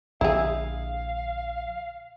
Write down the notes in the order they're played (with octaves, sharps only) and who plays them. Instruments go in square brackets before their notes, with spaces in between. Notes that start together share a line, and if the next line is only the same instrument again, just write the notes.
[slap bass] A#1 D3 [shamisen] E4 G#4 [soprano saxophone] F5